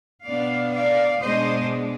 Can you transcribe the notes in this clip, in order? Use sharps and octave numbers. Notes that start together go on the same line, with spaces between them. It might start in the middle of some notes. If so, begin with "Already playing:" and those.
B2 B3 D4 D5 F5
D5 F5
B2 G#3 D4 C5 D#5